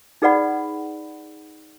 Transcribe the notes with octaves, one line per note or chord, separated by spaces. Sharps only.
D#4 G#4 B4 D5 F#5 B5